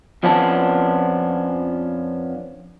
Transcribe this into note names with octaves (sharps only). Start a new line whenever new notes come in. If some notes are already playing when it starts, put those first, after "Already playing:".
F2 F3 B3 C#4 D4 A5